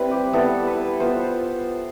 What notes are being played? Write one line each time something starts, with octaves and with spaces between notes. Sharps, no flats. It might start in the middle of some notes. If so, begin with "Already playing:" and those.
Already playing: G3 C4 E4 B4
G4
G3 B3 E4 A4
B4
B3 F4 C5